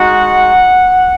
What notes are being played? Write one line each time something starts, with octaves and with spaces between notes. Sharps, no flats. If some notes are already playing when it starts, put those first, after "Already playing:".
Already playing: G#3 D#4 F#4 F#5